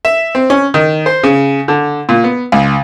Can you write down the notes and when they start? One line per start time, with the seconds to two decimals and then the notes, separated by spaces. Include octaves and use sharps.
0.05 E5
0.35 C4
0.50 C#4
0.74 D#3
1.06 C5
1.23 C#3
1.68 D3
2.09 A#2
2.24 B3
2.52 C#2